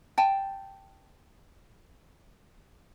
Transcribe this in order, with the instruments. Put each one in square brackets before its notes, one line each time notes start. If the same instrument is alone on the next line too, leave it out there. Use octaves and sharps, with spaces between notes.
[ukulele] G5 A5